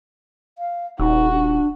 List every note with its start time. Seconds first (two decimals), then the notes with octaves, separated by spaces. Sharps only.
0.58 F5
0.99 D#1 D#4 F#4
1.32 D4